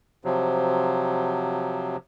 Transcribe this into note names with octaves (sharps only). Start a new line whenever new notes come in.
C3 F3 F#3